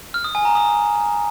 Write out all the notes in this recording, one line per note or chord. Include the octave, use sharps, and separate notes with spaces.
F6
D#6
G#5
A#5
D#6